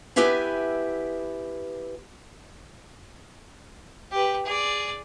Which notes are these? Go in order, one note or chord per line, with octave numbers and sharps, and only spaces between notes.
B3 E4 G4 B4 E5 G#5
G4 B4
G#4 D5